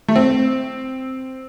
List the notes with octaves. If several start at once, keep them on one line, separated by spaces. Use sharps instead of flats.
A3
C4